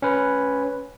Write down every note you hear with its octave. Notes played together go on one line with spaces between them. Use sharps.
C#4 B4